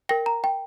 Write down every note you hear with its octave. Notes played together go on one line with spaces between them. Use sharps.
A#4 G5 A#6
A#5
G5